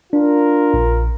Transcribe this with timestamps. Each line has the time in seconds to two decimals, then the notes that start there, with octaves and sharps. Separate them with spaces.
0.13 D4 F4 A#4
0.74 A#1